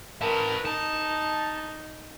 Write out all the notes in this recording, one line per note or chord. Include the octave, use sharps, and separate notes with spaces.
A#4 B4 A5
D#4 A5